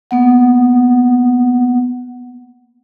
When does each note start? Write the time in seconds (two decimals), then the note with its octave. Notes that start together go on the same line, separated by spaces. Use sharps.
0.11 A#3 B3 F#5